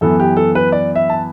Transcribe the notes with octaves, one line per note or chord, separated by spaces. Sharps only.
F#2 E3 B3 A4
G4
A4
B4
D5
E5
A5